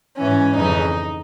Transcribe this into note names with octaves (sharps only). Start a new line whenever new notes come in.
G#2 E3 C#4
F2 C#3 E3 D#4